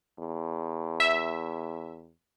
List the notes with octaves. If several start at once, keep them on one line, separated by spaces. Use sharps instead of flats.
E2
E5